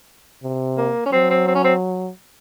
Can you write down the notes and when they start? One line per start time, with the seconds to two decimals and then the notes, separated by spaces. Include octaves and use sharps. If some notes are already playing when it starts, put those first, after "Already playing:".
0.43 C3
0.77 A#3
1.06 C#4
1.12 F#3 C4
1.30 C4
1.47 C4
1.55 C#4
1.64 C4